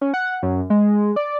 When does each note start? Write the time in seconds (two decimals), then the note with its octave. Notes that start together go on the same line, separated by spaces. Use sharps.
0.01 C#4
0.14 F#5
0.43 F#2
0.70 G#3
1.16 D5